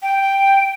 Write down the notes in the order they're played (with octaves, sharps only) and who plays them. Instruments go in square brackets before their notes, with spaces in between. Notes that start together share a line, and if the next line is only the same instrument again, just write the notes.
[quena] G5